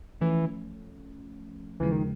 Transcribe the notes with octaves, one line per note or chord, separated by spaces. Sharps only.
E3 F3 A3 C#4
D#2 C#3 E3 F3 G#3
D#3